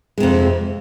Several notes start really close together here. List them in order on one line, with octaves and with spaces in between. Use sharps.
G#3 C3 F2